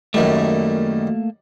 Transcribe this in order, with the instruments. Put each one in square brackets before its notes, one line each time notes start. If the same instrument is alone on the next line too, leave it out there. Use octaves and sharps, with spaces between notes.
[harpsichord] F#2 D#3 G3 [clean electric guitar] A3 A#3